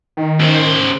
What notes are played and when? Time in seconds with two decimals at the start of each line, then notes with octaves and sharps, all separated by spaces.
0.17 D#3
0.40 C#3 C5